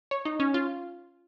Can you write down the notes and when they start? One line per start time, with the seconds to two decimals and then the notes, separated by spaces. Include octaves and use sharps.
0.11 C#5
0.25 D#4
0.40 C#4
0.54 F4